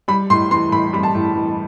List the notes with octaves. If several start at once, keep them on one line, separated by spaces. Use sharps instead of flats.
G3 B5
A2 C6
E3 C6
A2 B5
G3 B5
A5
A2
E3